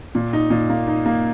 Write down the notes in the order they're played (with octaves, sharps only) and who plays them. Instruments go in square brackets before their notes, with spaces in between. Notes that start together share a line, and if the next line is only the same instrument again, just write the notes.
[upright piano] A#2
D#4
A#2
A#3
D#4
A#3